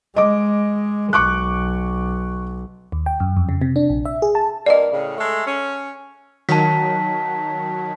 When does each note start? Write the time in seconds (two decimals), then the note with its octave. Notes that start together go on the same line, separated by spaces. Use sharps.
0.16 G#3 D#5 D6
1.13 B1 C#6 D6 F#6
2.92 D#2
3.06 G5
3.20 F#2
3.37 F2
3.49 C#3
3.62 C3
3.76 D4
3.90 A#1
4.05 E5
4.22 G#4
4.35 A5
4.66 G2 A#3 D5 D#5
4.92 A2 C#3
5.18 G#3 A3 A4
5.46 C#4
6.49 D#3 F#3 A5 B6